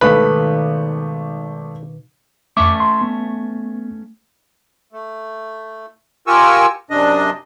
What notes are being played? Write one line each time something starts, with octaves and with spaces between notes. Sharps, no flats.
G#1 B2 D#3 A3 B4 B5
F2 A3 C#4 E5 D6
C6
B3
A3
F4 G4 A#4 G#5 C#6 E6
F#2 C3 D4 D#5